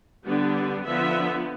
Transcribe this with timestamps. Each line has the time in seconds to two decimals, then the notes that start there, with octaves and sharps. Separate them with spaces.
0.25 D3 G3 B3 D4
0.85 D3 F3 B3 E5